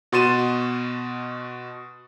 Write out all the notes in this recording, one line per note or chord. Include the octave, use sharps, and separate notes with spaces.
B2 F#4 C6 A6 D#7 E7